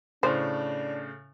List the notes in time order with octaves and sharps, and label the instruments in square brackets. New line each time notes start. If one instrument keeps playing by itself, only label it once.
[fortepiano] A2 C#3 [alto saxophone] D4 [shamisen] C5